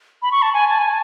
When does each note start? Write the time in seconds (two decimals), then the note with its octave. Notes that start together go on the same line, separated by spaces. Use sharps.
0.22 B5
0.32 C#6
0.42 A5
0.53 G#5
0.69 A5
0.78 G#5
0.88 A5